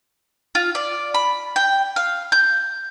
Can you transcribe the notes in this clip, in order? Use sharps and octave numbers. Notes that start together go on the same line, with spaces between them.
F4
D5
B5
G5
F5
G6